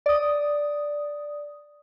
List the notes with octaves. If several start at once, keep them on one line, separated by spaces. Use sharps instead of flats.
D5 D#6